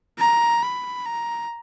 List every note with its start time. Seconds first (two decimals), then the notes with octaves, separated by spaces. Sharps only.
0.19 A#5
0.62 B5
1.06 A#5